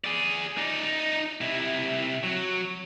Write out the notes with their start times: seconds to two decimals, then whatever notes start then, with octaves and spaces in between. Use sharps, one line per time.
0.04 G#4 D5
0.57 D#4 D5
1.41 C3 E4
2.23 F#3